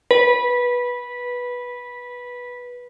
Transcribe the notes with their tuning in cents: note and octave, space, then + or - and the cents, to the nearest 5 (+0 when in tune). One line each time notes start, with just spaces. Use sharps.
B4 -15